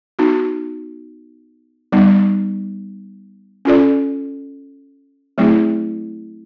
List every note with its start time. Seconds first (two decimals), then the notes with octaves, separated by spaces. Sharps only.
0.19 B3 D#4 F#4
1.92 G3 B3 D#4
3.65 C#4 F4 A4 D5
5.38 F#3 A3 C4 E4 G#4